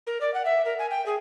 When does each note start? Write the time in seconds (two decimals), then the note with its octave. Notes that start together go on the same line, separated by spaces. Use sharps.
0.07 A#4
0.21 D5
0.34 F#5
0.45 E5
0.65 A#4
0.79 G#5
0.91 G5
1.06 G#4